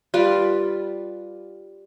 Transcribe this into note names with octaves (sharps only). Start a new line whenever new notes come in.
G3 F4 B4